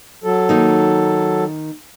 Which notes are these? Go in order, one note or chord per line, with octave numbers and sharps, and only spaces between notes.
F#3 A4
D#3 A#3 D#4